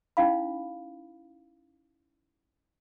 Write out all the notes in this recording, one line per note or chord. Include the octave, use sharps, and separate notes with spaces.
C#4 D#4 E4 F5 B5